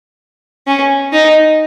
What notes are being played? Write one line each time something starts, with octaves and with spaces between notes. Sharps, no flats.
C#4
D#4